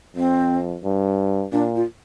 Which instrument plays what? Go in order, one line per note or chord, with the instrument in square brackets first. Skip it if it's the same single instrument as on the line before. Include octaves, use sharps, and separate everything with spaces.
[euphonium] F2 [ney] C4
[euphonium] G2
[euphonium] A#2 [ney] D4
[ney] F4